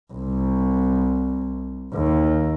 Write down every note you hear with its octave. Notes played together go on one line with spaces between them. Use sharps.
C2
D#2